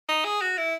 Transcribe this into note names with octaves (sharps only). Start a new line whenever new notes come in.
D#4
G#4
F#4
E4